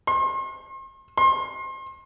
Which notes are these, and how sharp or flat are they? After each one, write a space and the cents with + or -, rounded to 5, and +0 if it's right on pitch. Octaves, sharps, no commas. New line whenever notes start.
C6 +45
C6 +35